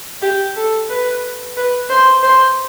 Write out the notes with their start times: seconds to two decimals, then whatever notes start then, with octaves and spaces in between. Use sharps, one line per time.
0.22 G4
0.56 A4
0.89 B4
1.57 B4
1.90 C5
2.23 C5